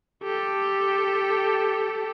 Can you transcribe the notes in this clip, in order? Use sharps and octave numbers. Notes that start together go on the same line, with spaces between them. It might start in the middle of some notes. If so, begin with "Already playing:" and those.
G4 A4